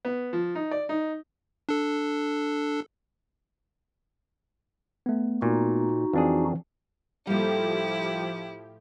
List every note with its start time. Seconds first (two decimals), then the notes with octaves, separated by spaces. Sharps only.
0.05 B3
0.33 F3
0.55 D#4
0.71 D5
0.89 D#4
1.69 D4 A4
5.06 A3 B3
5.42 A#2 D#4 F#4
6.13 F2 E3 F3 C4 D4 G#4
7.27 A2 F3 G3 A#3 E4 G4